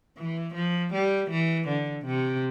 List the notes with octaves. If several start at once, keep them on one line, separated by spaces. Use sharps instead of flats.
E3
F3
G3
E3
D3
C3